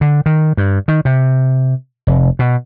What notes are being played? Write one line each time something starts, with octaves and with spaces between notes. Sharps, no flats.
D3
D#3
G2
D#3
C3
F1
B2